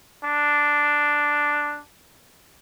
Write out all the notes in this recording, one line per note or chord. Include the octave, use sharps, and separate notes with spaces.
D4